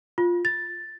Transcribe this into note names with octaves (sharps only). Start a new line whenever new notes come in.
F4
A6